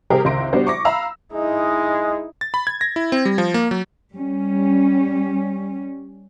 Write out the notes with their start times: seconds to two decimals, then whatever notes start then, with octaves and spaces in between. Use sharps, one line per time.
0.10 C3 G3 G4 G#4 A#4 C5
0.25 G#1 C#2 E5 C6 A#6 D7
0.53 G3 B3 D4 F#4 C5
0.67 C#6 D6 A#6
0.85 F5 A#5 B5 E6
1.33 G#3 D#4 E4
2.41 A6
2.54 B5
2.67 G#6
2.81 A#6
2.96 E4
3.12 C4
3.25 G3
3.38 F3
3.54 A#3
3.71 F#3
4.14 G3 C#4